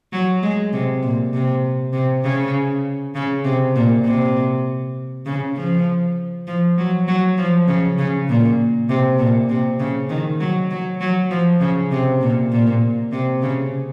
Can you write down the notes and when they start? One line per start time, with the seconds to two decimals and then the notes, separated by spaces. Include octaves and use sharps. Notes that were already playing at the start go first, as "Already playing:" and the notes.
0.13 F#3
0.43 G#3
0.73 C3
1.03 A#2
1.33 C3
1.93 C3
2.23 C#3
3.15 C#3
3.45 C3
3.76 A#2
4.05 C3
5.26 C#3
5.56 F3
6.47 F3
6.78 F#3
7.08 F#3
7.38 F3
7.68 C#3
7.98 C#3
8.29 A#2
8.89 C3
9.19 A#2
9.49 C3
9.80 C#3
10.09 D#3
10.40 F#3
10.70 F#3
11.01 F#3
11.30 F3
11.60 C#3
11.91 C3
12.21 A#2
12.52 A#2
13.12 C3
13.42 C#3